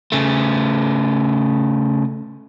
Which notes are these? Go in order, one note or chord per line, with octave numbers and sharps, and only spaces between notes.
C#3 A3